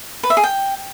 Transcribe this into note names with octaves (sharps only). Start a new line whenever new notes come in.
B4
E5
G#4
G5